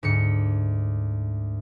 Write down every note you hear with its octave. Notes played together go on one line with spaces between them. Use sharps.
D2 G#2 C#7